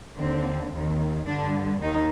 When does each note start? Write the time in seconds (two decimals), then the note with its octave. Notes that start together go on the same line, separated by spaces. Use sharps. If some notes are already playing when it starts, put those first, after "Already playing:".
0.18 D#2 D3 C4
0.72 D#2
0.77 D#3
1.27 G2 D3 D4
1.81 D#2 D#3 D#4